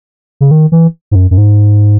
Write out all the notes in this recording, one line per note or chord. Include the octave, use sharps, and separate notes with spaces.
C#3
D#3
E3
G#2
F#2
F#2
G#2